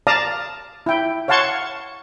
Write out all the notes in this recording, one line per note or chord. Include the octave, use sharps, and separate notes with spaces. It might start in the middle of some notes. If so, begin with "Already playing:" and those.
D5 F5 A5 A#5 D#6
E4 G5
C#5 F5 F#5 A5 C6 C#6